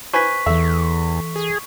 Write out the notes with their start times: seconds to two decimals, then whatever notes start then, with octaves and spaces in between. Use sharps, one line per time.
0.13 B4 C5 G#5 C#6 B6
0.46 E2 E3 A4 E5
1.36 G#4